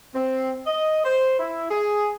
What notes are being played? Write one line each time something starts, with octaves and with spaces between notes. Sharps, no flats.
C4
D#5
C5
E4
G#4